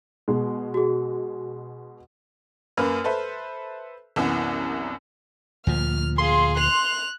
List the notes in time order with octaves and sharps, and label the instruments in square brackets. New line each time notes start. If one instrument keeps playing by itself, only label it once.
[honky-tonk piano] B2 G#3
[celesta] F#4 G#4
[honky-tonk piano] F#2 A#3 B4 F6
A4 B4 C5 E5
C2 F#2 E3 B3
[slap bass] D2 A#2 F3 [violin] F6
[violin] G#4 F5 [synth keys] C6
[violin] F#6 F7